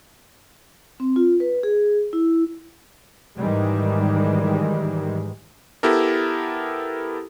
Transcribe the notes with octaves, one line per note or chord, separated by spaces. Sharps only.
C4
F4
B4
G#4
E4
G#2 D#3 E3 G3 G#3
B3 E4 G4 A4 A#4